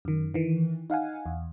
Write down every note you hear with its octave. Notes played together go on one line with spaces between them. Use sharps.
F#2 D#3
D#3 E3
D#4 F5 F#5 G#5
E2